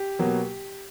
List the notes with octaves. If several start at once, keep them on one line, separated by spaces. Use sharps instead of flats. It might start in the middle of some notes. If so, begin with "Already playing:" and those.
Already playing: G4
B2 F#3 A#3